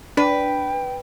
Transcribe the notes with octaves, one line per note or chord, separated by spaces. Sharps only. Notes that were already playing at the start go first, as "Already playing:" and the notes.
D4 B4 G5